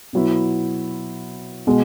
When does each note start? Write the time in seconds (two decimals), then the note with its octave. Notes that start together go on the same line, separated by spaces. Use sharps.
0.13 B2 F#3 B3 E4
1.67 B2 G#3